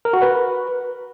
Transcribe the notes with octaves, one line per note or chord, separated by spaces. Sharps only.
A#4
F#4
B4